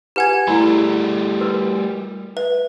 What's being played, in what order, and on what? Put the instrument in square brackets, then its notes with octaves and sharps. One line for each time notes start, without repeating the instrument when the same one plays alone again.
[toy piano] F4 B4 G#5 [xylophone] G4 F#5 G#6
[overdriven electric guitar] G3 A3 [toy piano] E4 F#4 B5
[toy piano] F#4 A#4 B4
[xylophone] B4 [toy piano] E5